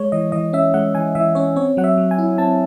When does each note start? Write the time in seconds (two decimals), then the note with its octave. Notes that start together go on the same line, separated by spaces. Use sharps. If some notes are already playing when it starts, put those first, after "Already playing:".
Already playing: G#3 C#5
0.12 E3 D#5
0.32 E3 D#5
0.53 C#4 E5
0.74 G#3 F#5
0.95 E3 G#5
1.15 E3 E5
1.35 C#4 C#5
1.56 C4 C#5
1.77 F#3 F#5
1.84 E5
1.98 F#3
2.11 G#5
2.19 E4
2.38 C4 A5